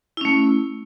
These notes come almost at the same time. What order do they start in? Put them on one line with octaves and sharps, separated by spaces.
E4 C#4 A3